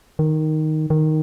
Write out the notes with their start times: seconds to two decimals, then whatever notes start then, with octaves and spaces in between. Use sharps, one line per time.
0.19 D#3
0.90 D#3